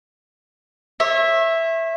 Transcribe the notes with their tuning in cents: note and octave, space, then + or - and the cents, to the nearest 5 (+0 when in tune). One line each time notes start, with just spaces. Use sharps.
C#5 -35 E5 +0